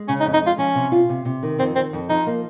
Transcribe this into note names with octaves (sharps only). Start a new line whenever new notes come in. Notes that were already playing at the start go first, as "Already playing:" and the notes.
Already playing: G#3
C#3 C#4
D#4
F2
D#4
G#3 F4
F3 C#4
C3
F4
C3
C3
D#3
F2 C4
D#3 C4
F2
F3 D#4
A#3